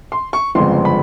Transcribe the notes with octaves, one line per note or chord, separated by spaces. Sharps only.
C6
C#6
G1 F2 C#3 F3 G#3 C6
B5